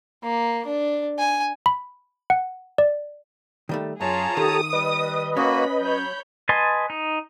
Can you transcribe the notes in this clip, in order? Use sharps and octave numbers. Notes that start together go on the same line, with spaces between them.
A#3
D4
G#5
B5
F#5
D5
D#3 G3 A3
F#2 F4 G#4 C#5 A5 A#5
D#3 G4 A4 D#6
G3 B4 D#5
A#3 C#4 F#4 B5
F#3 C#5 B5 G6
B4 D#5 G#5 A5 C6
D#4